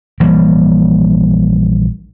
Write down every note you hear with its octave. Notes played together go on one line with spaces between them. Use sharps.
A#1 E3 G3 A#3